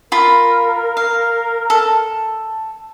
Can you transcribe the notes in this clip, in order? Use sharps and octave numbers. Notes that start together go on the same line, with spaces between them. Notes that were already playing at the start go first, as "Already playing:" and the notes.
F4 A#4 B5
F5
A4